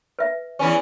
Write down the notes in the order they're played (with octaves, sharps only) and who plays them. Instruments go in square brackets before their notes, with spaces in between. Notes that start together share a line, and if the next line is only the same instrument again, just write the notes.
[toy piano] B4 E5
[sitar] E2 E3 C#4